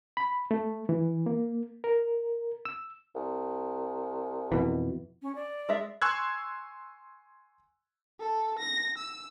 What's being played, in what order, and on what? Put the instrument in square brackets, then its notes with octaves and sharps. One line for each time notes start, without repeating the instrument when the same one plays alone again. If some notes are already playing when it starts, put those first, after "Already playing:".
[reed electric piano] B5
A3
E3
A#3
A#4
E6
[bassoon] C2
[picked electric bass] F2 B2 E3
[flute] C#4
D5
[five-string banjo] G#3 E5
[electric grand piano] G#5 C6 C#6 E6 F#6 G#6
[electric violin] A4
A#6
E6